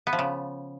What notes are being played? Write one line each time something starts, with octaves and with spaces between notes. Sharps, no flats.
B3
F3
C#3